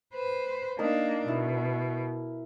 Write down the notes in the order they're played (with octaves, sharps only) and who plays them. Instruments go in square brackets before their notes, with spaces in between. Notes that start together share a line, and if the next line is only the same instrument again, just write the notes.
[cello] B4 C5
[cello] A#3 D4 [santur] D#4 A#4
[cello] B2 [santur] E4